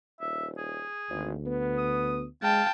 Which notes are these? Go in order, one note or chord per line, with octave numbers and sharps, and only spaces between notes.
D#1 E5
G#4
G#1 D2
B3
D#6
G#3 F5 G5 A5